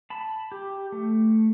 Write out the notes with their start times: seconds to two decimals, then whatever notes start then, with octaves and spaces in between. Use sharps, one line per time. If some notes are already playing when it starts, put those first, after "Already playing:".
0.10 A5 B5
0.52 G4
0.92 A3